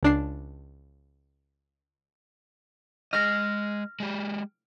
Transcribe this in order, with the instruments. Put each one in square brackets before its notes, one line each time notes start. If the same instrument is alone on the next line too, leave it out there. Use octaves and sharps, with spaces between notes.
[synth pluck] C#2 D4 C7
[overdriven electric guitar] G#3 D#5 [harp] F6 A#6
[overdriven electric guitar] G#3 G4